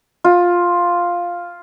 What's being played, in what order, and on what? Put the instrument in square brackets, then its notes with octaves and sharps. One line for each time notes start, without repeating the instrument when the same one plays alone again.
[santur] F4